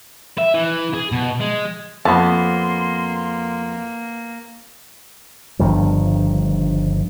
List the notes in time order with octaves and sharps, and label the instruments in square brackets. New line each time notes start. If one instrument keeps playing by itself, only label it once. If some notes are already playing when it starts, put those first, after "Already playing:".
[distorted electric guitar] E5
E3
G#4
B2
G#3
[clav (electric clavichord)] F2 [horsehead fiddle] A#3 [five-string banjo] B3 A5 [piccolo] C6
[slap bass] G1 G2 D#3 F3